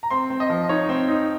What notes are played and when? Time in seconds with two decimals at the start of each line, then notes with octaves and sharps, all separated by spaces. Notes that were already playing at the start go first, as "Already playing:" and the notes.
0.03 A#5
0.10 C4 C6
0.30 C4
0.40 D#5
0.50 F3
0.69 D#4 C#5
0.89 C4
1.08 D#4